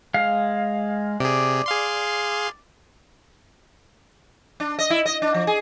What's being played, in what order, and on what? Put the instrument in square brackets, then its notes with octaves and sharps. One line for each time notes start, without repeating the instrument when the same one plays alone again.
[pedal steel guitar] G#3 F5
[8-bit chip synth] C3 G#4 [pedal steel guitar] D5
[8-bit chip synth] G#4 F5 C6
[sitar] D4
D#5
E4
D#5
D4
F3
G#4